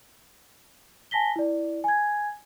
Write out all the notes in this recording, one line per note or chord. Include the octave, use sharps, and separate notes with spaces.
G#5 A5 A#6 B6 G7
E4 D5
G#5 G#6